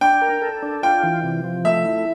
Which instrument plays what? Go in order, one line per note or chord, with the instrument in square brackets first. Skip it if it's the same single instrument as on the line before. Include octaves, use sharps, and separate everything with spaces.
[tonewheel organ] D4 [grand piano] G5
[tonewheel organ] A#4
A4
D4
[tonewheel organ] F4 [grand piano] G5
[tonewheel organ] E3
C3
F3
[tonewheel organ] A3 [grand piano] E5
[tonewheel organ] E4